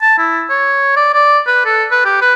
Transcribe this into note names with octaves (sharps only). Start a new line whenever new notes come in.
A5
E4
C#5
D5
D5
B4
A4
B4
G4
B4